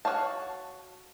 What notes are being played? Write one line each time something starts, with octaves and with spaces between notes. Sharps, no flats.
F#4 G#4 C#5 F5 A5